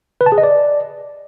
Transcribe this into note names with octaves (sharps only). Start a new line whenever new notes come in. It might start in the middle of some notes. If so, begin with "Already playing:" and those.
B4
A5
G#4
D#5
D5